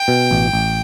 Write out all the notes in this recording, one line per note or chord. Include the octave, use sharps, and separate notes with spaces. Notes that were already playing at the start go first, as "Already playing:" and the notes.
Already playing: G5
B2
A1
A1